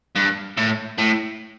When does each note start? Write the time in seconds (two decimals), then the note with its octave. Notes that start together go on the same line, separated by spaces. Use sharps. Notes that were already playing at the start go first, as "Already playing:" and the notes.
0.15 G2
0.57 A2
0.98 A2